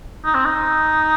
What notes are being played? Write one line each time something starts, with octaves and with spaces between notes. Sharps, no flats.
D#4
C4
D#4